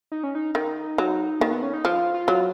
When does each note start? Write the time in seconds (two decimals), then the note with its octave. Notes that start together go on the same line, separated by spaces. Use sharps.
0.12 D#4
0.23 C#4
0.35 D#4
0.55 D#3 D#4
0.98 F#3
1.40 D#3 A#3
1.51 B3
1.63 C#4
1.74 D#4
1.85 F3 F4
2.14 F4
2.28 F#3